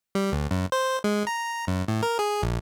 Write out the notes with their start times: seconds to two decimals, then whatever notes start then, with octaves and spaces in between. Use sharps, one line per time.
0.15 G3
0.32 D2
0.51 F#2
0.72 C5
1.04 G#3
1.27 A#5
1.67 F#2
1.88 A2
2.03 A#4
2.19 G#4
2.42 A#1